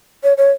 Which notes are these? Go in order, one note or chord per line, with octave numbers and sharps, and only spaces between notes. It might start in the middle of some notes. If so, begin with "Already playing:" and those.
C#5
C#5